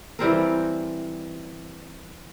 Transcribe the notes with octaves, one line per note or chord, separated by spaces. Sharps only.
E3 G3 C4 A#4